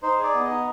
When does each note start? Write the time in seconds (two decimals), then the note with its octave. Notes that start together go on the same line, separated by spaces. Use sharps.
0.03 D#4 C5
0.18 G#4 D5
0.34 B3
0.44 D#4 D#5